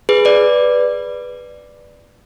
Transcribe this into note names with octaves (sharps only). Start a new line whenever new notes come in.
G#4 B4
B4 D5